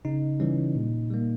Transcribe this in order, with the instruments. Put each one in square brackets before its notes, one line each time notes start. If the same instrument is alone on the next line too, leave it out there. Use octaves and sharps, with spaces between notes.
[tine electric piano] C#3 D#4
E3 G3 C#4
A#2
G3 A#3